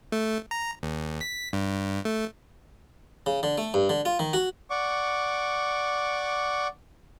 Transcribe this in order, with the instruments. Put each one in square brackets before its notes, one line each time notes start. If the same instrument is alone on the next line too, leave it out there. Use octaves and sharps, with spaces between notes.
[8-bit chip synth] A3
A#5
D#2
B6
G2
A3
[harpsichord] C#3
D3
A3
G2
D3
F4
D#3
F#4
[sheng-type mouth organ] D5 F#5 C#6 D6